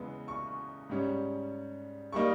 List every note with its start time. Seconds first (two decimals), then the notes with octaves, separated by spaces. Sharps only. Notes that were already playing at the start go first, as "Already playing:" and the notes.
Already playing: E2 C#3 G#3 B3
0.28 C#6
0.89 G#2 G3 C#4
2.12 G3 A#3 D#4 C#6